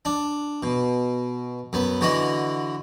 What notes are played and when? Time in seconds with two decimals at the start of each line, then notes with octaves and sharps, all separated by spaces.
0.05 D4
0.63 B2
1.73 F#2 B3
2.01 D3 E3 F#4 D#5